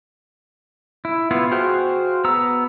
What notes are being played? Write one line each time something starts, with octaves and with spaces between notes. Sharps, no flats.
E4
B3 E4 F4
F#4 G#4 C5 F5 G5
B3 A#5 E6